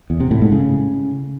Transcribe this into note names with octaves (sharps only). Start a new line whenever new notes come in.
E2
C3
A2
G#2
C#3